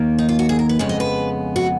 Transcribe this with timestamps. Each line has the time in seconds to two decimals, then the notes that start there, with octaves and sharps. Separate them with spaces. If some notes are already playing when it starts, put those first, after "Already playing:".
Already playing: D#2 D#3 A#3
0.18 D#4
0.29 F4
0.39 F#4
0.49 G#4
0.59 A#4
0.69 B4
0.79 F2 C#3 G#3 B3 C#5
0.89 D#5
1.00 B4
1.56 F#4